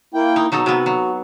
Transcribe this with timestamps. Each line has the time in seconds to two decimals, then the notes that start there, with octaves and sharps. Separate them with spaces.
0.14 A#3 E4 G5
0.36 D#4
0.52 B2 F#3 D#4 A4
0.66 C3 B3 F#4
0.86 F#3